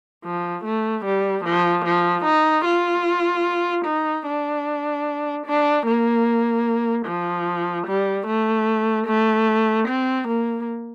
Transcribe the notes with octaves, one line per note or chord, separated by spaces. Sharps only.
F3
A3
G3
F3
F3
D#4
F4
D#4
D4
D4
A#3
F3
G3
A3
A3
C4
A#3